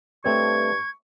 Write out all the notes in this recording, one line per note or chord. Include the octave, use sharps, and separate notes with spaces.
G2 A3 C4 C#5 C#6 G#6